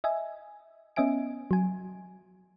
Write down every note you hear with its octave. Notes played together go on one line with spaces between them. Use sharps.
D#5 E5 G#5
B3 C#4 D#5 E5 G#5 D7
F#3 G#5